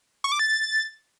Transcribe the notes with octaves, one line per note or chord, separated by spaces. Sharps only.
C#6
D6
A6